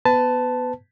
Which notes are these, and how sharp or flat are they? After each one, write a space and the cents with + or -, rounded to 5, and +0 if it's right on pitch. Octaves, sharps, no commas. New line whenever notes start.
B3 +0 B4 +30 A5 +0